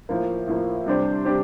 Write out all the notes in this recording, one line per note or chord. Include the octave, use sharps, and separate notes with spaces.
A2 F3 A#3
A2 F3 A#3
C3 G3 D4 G4 C5
C3 G3 D4 G4 C5